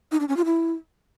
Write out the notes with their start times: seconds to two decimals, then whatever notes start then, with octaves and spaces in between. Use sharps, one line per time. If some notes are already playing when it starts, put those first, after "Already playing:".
0.12 D#4
0.20 D4
0.28 C#4
0.37 F4
0.45 E4